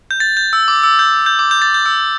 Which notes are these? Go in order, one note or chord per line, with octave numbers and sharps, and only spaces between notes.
G6
A6
G6
E6
D6
E6
G6
G6
D6
G6
A6
G6
E6